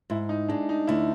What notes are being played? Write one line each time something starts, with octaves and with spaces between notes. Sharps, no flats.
G#2 E4
D#4
G#3 D4
D#4
D2 E4